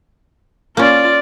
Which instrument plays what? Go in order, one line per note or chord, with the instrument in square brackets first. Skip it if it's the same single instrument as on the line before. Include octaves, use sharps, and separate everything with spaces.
[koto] A#3 C#4 [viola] F4 D5